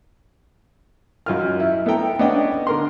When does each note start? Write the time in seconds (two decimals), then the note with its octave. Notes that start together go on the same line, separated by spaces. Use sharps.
1.26 F#2 F4 F6
1.60 E4
1.86 B3 E4 A4 G5 A#5
2.19 B3 C#4 D4 D#5 F#5 G5
2.67 D3 A#4 C6